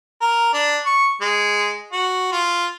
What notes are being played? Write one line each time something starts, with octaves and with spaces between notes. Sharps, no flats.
A#4
D4
C#6
G#3
F#4
F4